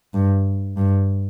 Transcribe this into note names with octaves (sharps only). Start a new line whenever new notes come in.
G2
G2